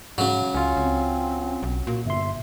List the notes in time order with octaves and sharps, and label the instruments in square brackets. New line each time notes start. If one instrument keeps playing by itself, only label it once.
[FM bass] G#2 [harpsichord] C#3 F#3
[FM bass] C#2 [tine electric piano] C#4 F4
[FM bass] C#2 [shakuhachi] C4
[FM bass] B1
[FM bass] A#2 [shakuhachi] F#4
[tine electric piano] G1 C6 [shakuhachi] E5